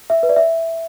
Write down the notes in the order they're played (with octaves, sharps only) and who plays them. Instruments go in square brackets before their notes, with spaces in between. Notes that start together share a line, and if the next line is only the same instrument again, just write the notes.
[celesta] E5
B4
D5
E5